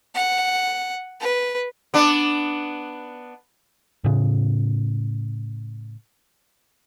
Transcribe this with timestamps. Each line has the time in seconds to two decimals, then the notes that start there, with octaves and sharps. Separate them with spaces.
0.15 F#5
1.21 B4
1.94 B3 D4
4.04 A2 C#3